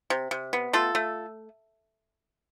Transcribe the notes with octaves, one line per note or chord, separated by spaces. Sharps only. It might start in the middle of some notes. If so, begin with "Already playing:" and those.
C3
C3
B3
A3 F4 A4
A3